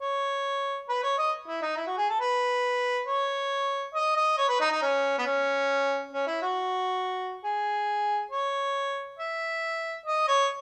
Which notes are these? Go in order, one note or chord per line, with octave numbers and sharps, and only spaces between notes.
C#5
B4
C#5
D#5
E4
D#4
E4
F#4
G#4
A4
B4
C#5
D#5
D#5
C#5
B4
D#4
D#4
C#4
B3
C#4
C#4
E4
F#4
G#4
C#5
E5
D#5
C#5